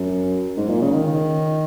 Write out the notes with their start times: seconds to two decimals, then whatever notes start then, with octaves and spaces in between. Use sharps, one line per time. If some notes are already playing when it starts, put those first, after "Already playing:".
Already playing: F#2
0.57 G#2
0.69 A#2
0.82 C#3
0.94 D#3